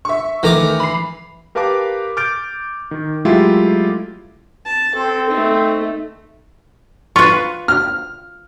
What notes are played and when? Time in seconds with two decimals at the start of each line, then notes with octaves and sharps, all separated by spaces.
0.05 E5 C#6
0.43 D#3 E3 A3 A#5 D6
0.80 B5 C7
1.55 G4 A#4 B4 F5 A5 D6
2.17 D6 F6 G6 A6 D7
2.91 D#3
3.25 F#3 G#3 A3 E4 F4 G4
4.66 A5
4.95 C4 A4
5.30 A3 D#4
7.16 F4 B4 C#6
7.68 F6